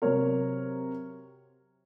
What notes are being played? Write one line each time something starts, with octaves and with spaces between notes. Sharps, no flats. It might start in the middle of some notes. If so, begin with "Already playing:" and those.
C3 F#3 A#4 C#5